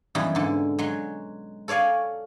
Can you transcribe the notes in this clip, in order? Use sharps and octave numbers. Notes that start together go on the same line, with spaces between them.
F#2 B2 E3 G3
G#2 D3
F#3 G#3
A4 C#5 D5 F5 G#5